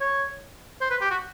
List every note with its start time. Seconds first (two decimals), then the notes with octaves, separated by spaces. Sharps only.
0.01 C#5
0.81 C5
0.90 B4
1.01 G4
1.11 F#4